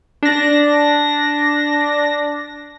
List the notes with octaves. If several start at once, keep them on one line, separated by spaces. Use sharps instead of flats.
D4 A#6